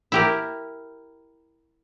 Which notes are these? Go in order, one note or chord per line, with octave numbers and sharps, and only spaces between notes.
E4 G4 A#4